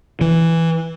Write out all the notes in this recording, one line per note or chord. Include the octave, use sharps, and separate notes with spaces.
E3